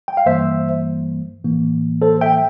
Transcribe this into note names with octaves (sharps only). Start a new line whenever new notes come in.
G5
F5
G2 E3 G3 A#3 C5 E5
A2 E3 A#3
A4 C5
E5 G5
G5